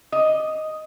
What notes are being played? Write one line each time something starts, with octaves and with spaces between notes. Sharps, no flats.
D#5